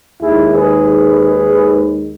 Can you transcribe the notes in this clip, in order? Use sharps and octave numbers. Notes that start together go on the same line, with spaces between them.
D#2 D#3 G#3 E4 G#4
G#4 B4